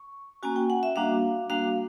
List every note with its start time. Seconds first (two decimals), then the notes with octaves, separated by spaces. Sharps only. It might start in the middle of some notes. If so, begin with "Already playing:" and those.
Already playing: C#6
0.43 A#3 C#4 F#4 G#5
0.56 G5
0.70 F#5
0.83 E5
0.96 G3 A#3 D4 F#4 F5
1.50 G3 A#3 D4 F#4 F5